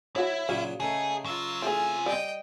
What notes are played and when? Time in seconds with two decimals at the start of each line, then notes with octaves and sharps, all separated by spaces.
0.16 F#3 E4 F#4 C#5
0.49 A#2 C#3 F#3 F5
0.80 C#3 A3 D#4 G#4
1.25 F#3 F4 E6
1.62 E3 A3 C4 G#4 G#5
2.06 G3 D#5 G5